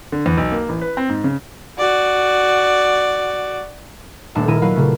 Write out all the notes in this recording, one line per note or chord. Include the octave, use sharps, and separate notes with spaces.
D3
E2
B1
A#3
A1
B4
C4
G#2
C#3
F#4 D5
D#1 A3 D4 A5
A#2 D#3 E4 A#4 D#7
F#3 E4 B4 F5
A#2 C#3 A3